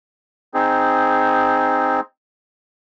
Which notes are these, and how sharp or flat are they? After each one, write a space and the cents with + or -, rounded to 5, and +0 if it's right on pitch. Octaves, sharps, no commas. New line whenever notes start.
C4 -5 D#4 +0 G#4 +0